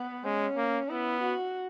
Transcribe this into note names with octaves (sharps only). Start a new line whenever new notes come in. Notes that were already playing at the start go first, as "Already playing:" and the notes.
Already playing: B3
G#3 C#4
A#3
B3 E4
F#4